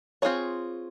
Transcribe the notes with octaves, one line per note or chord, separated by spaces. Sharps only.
C4 F4 G#4 C#5